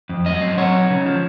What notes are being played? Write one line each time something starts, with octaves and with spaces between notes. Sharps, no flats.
F2
F#3 D#5
C4
F#3 C#5
D#4
C#3
F3